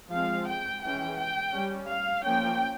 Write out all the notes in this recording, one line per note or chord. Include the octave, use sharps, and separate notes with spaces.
F3 G#3 C4 F5
G5
E3 G#3 C#4 G5
G5
G3 C#4
F5
F3 A#3 C#4 G5